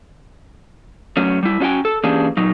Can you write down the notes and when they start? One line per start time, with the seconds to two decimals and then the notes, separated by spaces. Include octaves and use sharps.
1.17 F#2 F#3 A3 C#4
1.43 G3 E4
1.60 C#4 D4 F#4 D#5 G5 G#5
1.85 A4
2.04 E3 A#3 C#4 D4 G4 G#4
2.37 A#2 F#3 D#4